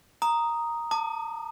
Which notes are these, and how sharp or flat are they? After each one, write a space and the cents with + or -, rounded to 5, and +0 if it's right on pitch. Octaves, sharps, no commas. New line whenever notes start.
A#5 +0 D#6 +0
A5 +35 D#6 -45